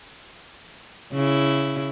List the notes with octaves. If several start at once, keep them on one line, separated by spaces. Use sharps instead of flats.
C#3 E4